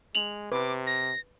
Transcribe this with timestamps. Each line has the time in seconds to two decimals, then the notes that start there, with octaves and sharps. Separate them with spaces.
0.15 G#3 F7 F#7
0.52 C3 B4 D6
0.87 A#6